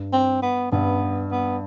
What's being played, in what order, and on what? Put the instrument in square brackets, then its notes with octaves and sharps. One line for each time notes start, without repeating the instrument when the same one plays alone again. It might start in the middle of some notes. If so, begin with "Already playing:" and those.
Already playing: [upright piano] G2
[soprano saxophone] C4
B3
[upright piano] G2 [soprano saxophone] B3
[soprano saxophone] B3